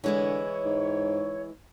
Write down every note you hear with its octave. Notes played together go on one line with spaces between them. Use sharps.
D3 E3 G#3 E4 C#5
G#2